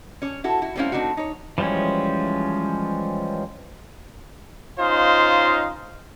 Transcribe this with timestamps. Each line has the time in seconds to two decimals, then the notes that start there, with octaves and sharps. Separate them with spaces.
0.22 C#4 C#5
0.44 E4 F#4 A4
0.62 E4 F#4
0.76 G3 A3 C4 C#4 E4 F5
0.92 A3 C4 D4 D#4 F#4
1.17 D#4 C#5
1.58 E3 F3 G3 G#3 C#4
4.79 C#4 D#4 F4 C5 D#5 F5